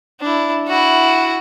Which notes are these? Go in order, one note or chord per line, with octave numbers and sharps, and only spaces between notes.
D4 E4
E4 F#4